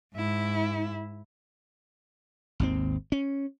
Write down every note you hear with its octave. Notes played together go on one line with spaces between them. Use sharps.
G#2 E4
G#1 D#2 C4
C#4